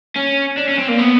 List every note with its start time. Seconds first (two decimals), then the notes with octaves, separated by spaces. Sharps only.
0.16 C#4
0.57 D4
0.68 C#4
0.79 C4
0.89 A#3
0.99 B3